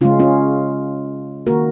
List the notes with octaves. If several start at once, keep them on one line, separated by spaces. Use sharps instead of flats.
C#3 G#3 C#4 F4
C#4 F4
D#3 A#3 F#4 A#4